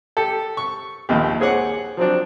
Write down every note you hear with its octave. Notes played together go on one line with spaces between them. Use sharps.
G4 A4
C#6
A#1 D#2 G4
C4 G#4 C#5 F#5 D6
F3 F#3 C4 D4